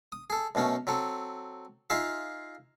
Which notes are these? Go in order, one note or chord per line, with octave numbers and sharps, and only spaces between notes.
D#6
G#4 A4
F#2 B2 A3 C#4
F#3 C4 A4
D#4 F4 G#4 E5 F5